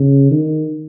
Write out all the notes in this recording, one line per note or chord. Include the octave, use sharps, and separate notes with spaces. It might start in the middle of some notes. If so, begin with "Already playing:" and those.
Already playing: C#3
D#3